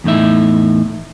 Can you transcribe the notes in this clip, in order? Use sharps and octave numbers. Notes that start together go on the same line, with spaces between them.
E2 A2 D#4 E5